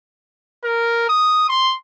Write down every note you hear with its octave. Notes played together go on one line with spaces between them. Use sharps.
A#4
D#6
C6